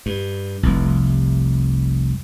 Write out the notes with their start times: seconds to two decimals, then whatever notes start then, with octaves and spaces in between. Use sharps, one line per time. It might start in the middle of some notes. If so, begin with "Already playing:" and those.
0.06 G2
0.63 F1 C2